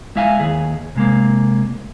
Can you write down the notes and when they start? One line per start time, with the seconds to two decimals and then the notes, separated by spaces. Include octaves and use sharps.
0.16 G#3 E4 E5 F5 G#5
0.40 D#2 G#4
0.96 C3 G#3 A#3